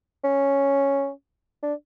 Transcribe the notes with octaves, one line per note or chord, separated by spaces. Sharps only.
C#4
D4